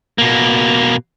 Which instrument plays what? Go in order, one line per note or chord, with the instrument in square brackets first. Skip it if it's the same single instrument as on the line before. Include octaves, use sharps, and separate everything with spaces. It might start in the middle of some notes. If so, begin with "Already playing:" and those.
[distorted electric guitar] B2 A#3